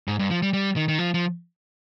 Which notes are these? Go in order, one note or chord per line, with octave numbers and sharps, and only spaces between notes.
G#2
G2
F3
G3
G3
D#3
D#3
F3
F3